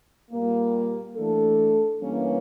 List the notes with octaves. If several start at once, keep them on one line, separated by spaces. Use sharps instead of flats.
A#2 G3 A#3
E3 A3 D4 A4
G2 E3 A#3 C#4